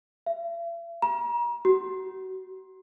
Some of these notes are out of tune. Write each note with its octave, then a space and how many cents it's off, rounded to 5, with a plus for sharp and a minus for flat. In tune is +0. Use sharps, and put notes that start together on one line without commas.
E5 +45
A#5 +40
F#4 +30